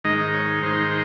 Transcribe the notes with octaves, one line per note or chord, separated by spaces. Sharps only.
G#2 D#3 G#3 D#4 D#5
C#5
G#2 D#3 G#3 D#4 C5